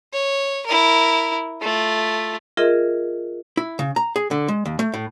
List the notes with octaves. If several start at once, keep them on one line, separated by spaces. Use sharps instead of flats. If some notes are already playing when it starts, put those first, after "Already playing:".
C#5
E4 A#4
A3 F4
F4 G#4 A#4 D#5 E5
E4
C#3
A#5
G#4
D3
G#3
D#2
A3
A2